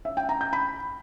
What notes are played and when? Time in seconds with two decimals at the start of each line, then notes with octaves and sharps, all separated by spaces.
0.05 E5
0.17 G5
0.29 A#5
0.41 G6
0.53 B5